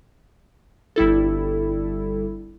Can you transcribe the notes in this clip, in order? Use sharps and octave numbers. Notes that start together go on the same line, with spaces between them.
G1 G3 E4 A4